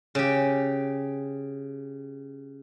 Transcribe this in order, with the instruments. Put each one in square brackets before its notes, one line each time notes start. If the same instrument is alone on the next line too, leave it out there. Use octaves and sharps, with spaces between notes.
[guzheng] C#3 G4